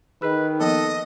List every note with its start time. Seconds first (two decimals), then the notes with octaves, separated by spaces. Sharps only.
0.22 D#3 G#4 B4 D#5
0.60 F3 A#3 B3 A4 D#5